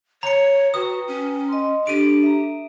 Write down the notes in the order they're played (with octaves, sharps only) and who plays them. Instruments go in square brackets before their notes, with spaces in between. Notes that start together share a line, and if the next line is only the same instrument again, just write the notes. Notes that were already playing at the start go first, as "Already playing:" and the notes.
[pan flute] C#5 [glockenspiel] A#5 C#7
[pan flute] F#4 [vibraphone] B4 G5 A#5 [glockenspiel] D#6
[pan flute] C#4
[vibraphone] D#5 C6
[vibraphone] D4 A4 [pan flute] G4 [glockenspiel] D7 D#7
[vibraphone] E5 A#5